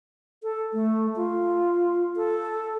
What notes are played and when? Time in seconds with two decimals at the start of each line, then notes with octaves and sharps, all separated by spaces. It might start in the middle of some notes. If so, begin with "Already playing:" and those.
0.43 A4
0.73 A3
1.16 F4
2.16 A4